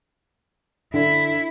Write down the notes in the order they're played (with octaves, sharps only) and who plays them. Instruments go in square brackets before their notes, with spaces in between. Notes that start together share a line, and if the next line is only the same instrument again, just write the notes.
[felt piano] D3 [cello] E4